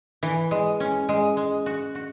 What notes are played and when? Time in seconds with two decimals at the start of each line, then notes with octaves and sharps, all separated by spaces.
0.23 E3
0.51 G#3
0.80 C#4
1.09 G#3
1.37 G#3
1.66 F#4
1.95 F#4